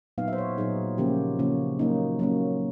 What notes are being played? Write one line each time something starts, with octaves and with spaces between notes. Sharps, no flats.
A#2 F#3 B3 D#4 F5
C5 E5
C#5
A#2 F#3 B3 D#4 G#4
C#3 F3 A#3 C#4 G4
C#3 F3 A#3 C#4
F#3 A#3 C#4 D#4
F#3 A#3 C#4